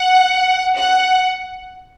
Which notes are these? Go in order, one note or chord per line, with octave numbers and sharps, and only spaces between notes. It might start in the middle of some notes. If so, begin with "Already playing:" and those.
Already playing: F#5
F#5